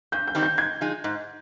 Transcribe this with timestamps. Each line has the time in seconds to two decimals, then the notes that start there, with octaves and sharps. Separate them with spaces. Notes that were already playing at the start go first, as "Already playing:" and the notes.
0.12 G2 G6
0.27 G6
0.35 D#3 G3 C4 D#4
0.43 G6
0.58 G#2 G#6
0.81 F3 G#3 D#4
1.04 G#2